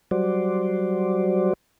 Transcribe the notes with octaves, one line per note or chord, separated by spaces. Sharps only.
F#3 G3 F#4 C5 D5